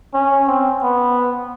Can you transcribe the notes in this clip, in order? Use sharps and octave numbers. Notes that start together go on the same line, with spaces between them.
C#4
C4
B3